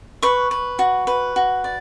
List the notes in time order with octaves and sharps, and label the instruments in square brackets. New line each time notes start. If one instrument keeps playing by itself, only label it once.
[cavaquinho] B4 C#6
B4
F#4
B4
F#4
D5